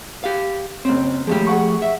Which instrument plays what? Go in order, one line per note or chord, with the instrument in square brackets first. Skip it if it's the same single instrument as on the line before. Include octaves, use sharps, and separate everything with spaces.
[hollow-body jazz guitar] G4 F5
[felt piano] F#1 C#4 [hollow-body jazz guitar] C4
[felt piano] D#2 G#3 [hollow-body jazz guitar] F3 A3 G4
[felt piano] G#4 F#5 C#6
[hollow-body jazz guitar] E5